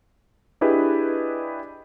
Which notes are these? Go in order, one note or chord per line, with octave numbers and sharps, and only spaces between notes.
D4 E4 G4 G#4 B4 D#5